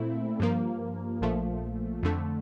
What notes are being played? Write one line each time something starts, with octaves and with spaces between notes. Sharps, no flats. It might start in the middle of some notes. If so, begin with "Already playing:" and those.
Already playing: A#2 A3 C4 E4
G2 F3 A#3
A#1 A#2 F3 A3
F2 D3 A3